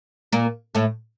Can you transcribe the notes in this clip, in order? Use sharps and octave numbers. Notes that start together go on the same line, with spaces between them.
A#2 A#3
A2 A3